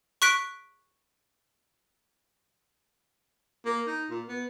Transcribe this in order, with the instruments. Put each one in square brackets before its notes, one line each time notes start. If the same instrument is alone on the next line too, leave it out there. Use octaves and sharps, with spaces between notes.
[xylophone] C#6 F#6 B6 D7
[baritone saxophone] A#3
D#4
A#2
B3